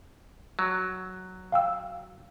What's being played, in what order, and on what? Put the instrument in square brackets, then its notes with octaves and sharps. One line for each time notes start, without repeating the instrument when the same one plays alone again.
[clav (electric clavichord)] F#3
[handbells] F5 G5 E6